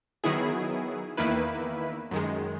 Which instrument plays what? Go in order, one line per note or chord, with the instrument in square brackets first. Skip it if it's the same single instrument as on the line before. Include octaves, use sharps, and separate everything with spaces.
[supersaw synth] D#3 F#3 B3 E4 G#4
E2 D#3 A#3 E4 B4
F#2 D#3 G#3